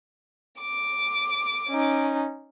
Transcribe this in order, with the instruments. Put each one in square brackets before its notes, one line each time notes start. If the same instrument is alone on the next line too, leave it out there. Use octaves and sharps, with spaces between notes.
[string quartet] D6
[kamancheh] C#4 D#4